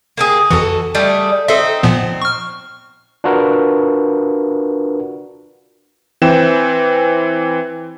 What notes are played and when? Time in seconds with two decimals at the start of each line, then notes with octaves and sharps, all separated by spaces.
0.17 A#3 G4 G#4
0.51 F2 E3 F#4 A4
0.95 G3 A3 G#4
1.48 C4 D#4 A4 E5
1.83 A#2 F3 B3
2.22 C#6 F6
3.24 D4 F4 F#4 A#4 B4
6.22 E3 C4 G5 E7